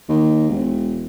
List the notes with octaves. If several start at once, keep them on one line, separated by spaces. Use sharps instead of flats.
D#2
E1